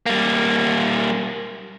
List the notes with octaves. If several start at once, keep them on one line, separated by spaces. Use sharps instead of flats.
G3 A#3